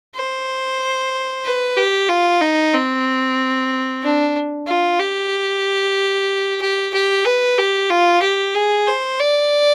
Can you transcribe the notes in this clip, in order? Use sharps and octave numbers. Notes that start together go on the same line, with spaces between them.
C5
B4
G4
F4
D#4
C4
D4
F4
G4
G4
G4
B4
G4
F4
G4
G#4
C5
D5